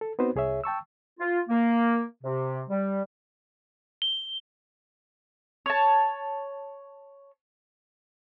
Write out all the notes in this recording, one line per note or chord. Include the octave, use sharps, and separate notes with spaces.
A4
B3 C4 D#4 F#4 B4 C5
C2 G#4 C#5 E5
G5 A5 C#6 E6
F4
A#3
C3
G3
G7
C#5 A5